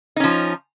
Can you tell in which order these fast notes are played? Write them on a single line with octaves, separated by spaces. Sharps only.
D#4 C#4 F3